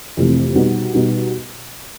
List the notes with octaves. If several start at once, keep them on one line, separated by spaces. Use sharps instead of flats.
F2 C3 E3 A3 C4
B2 G3 B3 D#4 F#4
B2 G3 B3 D#4 F#4